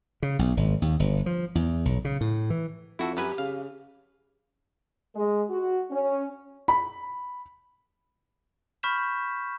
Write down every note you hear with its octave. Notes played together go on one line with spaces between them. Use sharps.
C#3
B1
G#1
D#2
G1
F3
E2
B1
C#3
A2
E3
F2 E4 F#4 A4
F#2 G4 B4 G#5
C#3 F5
G#3
F#4
C#4
B5
B5 C#6 F6 G6 B6 E7